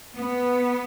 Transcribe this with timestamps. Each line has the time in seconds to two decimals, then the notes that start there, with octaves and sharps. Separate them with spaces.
0.15 B3